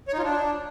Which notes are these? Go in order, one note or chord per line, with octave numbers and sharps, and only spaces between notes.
C#5
D#4
F4
D4